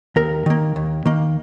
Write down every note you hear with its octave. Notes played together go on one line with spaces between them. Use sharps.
D#2 A#4
D#3 A#3
D#2
D#3 A#3